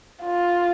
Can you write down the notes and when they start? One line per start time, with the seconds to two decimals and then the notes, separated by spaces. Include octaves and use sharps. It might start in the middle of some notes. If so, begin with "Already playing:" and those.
0.24 F4